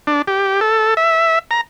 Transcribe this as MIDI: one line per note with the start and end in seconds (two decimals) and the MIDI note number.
0.07 0.22 62
0.27 0.60 67
0.61 0.94 69
0.97 1.39 76
1.51 1.61 82